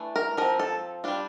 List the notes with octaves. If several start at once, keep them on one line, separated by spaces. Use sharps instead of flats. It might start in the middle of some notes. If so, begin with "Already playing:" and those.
Already playing: E3 A3 D4
A#4
F3 C4 A#4
A4
G3 D4 F4